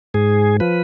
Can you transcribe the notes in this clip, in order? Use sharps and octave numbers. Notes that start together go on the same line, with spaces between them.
G#2 G#4
F3 B4